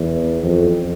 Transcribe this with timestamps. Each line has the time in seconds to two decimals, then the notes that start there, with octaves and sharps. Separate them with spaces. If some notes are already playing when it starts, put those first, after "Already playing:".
Already playing: E2
0.43 F2